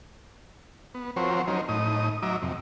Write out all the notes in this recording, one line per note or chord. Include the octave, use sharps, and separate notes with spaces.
B3
F3 C4 F#4 A#4 C5 C#5
F#3 C#4 D#4 A#4 C5
A2 D#4 D#6
F#3 D#5 E5 A#5 D6
F2 C3